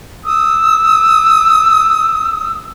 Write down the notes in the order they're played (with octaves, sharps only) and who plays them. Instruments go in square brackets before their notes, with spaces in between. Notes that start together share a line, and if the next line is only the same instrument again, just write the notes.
[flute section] D#6 E6